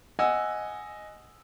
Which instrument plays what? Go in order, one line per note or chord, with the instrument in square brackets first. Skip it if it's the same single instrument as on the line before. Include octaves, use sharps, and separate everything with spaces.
[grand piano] D#5 F#5 G#5 E6